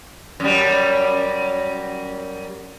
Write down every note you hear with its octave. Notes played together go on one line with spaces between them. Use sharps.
F#2 G3